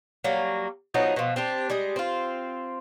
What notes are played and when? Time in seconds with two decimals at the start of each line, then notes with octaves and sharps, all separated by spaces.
0.24 F#3 G3 A#3
0.94 F3 F#3 B3 D#4
1.16 B2 F3
1.36 C4 D4 G4
1.70 G3 G#3 G#4
1.96 C4 F4